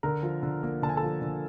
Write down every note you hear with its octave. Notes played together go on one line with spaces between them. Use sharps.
D3 A#4 A#5
F3
D3
A#3
D3 A5
G#5
A4 A5
F3
D3